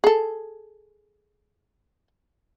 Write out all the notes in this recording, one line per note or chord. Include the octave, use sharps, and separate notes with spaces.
G#4 A4